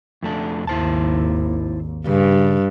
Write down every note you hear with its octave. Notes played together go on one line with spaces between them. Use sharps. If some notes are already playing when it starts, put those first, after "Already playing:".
F2 A3 D4
G#1 D#2 E4 C5 A5
G2 C#3